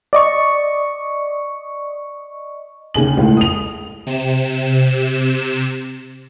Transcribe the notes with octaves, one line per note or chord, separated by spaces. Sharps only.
D5 D#5 C#6
D#2 C#3 G#5 F#7
C#2 A2
D#6 F7
C3 E7